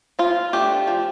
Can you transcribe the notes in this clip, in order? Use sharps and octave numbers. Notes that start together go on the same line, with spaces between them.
F3 F4
A3 D4 G4
F3